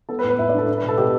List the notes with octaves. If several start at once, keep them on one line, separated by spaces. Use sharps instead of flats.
B3 A4
B4
A2
B4
A2 E5
D5
D4 A4
D4
B4
B2
A4
B2 G4